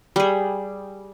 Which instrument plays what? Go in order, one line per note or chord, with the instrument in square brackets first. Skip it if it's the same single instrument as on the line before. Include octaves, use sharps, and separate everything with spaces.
[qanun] G3 G#4